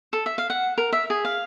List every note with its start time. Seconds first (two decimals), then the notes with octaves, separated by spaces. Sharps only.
0.13 A4
0.26 E5
0.38 F5
0.50 F#5
0.78 A#4
0.92 E5
1.10 G#4
1.25 F5